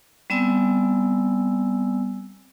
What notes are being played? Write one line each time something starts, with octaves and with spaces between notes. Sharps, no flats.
G3 B3 C4 D5 G#5 E6